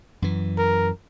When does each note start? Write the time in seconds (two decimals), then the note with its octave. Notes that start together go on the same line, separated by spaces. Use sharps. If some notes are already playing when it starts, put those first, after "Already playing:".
0.22 F#2 E3
0.57 A#4